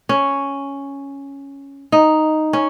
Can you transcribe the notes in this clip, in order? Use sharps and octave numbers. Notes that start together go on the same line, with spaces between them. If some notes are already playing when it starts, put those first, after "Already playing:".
C#4
D#4
C#4